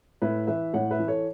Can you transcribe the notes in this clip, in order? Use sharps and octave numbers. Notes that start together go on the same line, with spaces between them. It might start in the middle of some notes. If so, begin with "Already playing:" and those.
A2 B4 E5
E3 B4 E5
A2 C#5 F#5
B4 E5
E3
A4 C#5